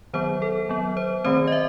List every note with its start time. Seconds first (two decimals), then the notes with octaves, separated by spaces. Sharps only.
0.13 D#3 F#3 B3 C5
0.42 A4
0.69 F#3 B3
0.97 C5
1.25 D#3 A3 C4 C5
1.48 D#5
1.52 E5